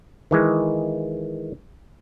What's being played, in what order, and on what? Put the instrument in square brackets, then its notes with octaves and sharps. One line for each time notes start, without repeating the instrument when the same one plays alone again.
[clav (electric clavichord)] D#3 E3 G#3